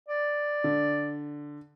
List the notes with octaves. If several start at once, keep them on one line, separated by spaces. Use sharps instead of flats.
D5
D3